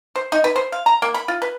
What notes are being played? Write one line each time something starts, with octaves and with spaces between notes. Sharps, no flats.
C5
D#4
B4
C5
F5
A#5
A#3
B5
F4
B4